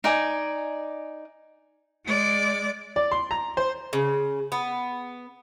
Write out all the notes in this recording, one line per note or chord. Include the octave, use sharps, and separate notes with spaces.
D#4 D5 G#5
G#3 D5
D5
C6
A#5
C5
C#3
B3